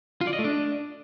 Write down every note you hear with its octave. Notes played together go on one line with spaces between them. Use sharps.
F4
D5
D#5
A3
D4